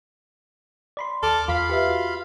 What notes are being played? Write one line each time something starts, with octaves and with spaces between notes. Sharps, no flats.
D5 B5 C6
D#2 A4 D6 F6
E2 F4 F5 B5 B6
G4 B4 E5
F#4